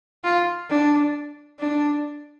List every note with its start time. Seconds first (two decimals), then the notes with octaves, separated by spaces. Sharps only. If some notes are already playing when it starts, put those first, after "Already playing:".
0.24 F4
0.69 D4
1.59 D4